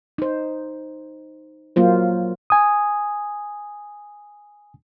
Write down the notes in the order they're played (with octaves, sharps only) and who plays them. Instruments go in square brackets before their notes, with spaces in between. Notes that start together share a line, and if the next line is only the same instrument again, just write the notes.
[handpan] D#4 C5
F#3 A#3 F4 C5
[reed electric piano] G#5 D#6